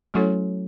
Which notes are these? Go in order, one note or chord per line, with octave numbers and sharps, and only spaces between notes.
F#3 A3 C#4 E4 A4 C#5